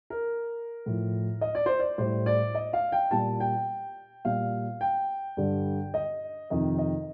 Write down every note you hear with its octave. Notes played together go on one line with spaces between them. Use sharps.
A#4
A2 F3
D#5
D5
C5
D5
A2 G3 C5
D5
D#5
F5
G5
A#2 G3 A5
G5
A#2 G3 F5
G5
G2 D3 G3
D#5
F2 C3 D#3 D#5
D#5